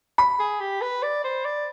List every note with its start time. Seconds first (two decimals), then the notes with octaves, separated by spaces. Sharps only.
0.18 B5
0.40 G#4
0.60 G4
0.81 B4
1.03 D5
1.24 C5
1.45 D5